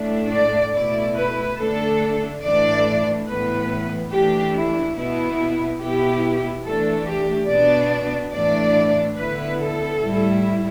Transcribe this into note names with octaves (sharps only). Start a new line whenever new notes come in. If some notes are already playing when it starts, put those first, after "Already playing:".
Already playing: A2 A3 D4
D5
B2 A3 E4 D5
B4
D3 A3 D4 A4
A2 E3 A3 D4 D5
A2 E3 B3 B4
E3 A3 D4 G4
E4
B2 B3 E4
B2 B3 E4 G4
E3 A3 D4 A4
G4
B2 B3 D4 D5
A2 E3 A3 D4 D5
D3 B3 E4 B4
A4
A2 G3 E4